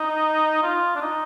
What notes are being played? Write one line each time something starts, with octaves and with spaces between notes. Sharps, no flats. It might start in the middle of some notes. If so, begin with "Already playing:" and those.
Already playing: D#4
F4
D4
D#4